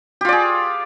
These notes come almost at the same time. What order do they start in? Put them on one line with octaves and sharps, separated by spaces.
G4 F4 D5 G#4